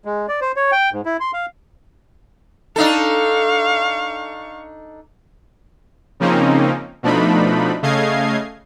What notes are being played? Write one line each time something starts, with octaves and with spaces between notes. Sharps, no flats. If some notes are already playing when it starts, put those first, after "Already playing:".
G#3
D5
C5
C#5
G5
G#2
E4
C6
F5
D4 D#4 A4 F5 C#6
C#3 F3 A#3 C4 C#4 D#4
B2 F3 A3 D4 D#4 B5
C#3 A3 D#5 F5 G#6 C7